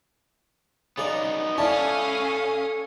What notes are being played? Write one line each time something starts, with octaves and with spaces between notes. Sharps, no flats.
C#3 B3 D#4 D5
C#4 E4 A4 C#5 D5 F5 A5 D#6